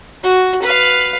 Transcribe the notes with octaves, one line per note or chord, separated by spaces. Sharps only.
F#4
B4 F5